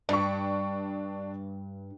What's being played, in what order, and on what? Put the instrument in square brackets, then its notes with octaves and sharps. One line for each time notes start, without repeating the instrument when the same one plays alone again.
[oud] G2 [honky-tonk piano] D4 C#6